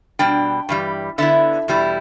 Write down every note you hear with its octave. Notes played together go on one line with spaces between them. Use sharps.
B2 G3 D4 G5
G2 E3 G3
D3 B3 E4 E5
E2 B2 G3 E4